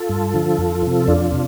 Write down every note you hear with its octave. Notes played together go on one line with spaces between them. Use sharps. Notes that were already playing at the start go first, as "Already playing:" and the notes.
Already playing: F4 A4
G2
D3 F3
F2
C3 F3
F2 D4 F4
C3